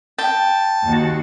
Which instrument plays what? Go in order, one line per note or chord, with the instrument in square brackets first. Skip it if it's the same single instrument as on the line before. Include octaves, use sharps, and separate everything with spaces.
[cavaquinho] G5 [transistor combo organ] A5
[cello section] D#2 F#4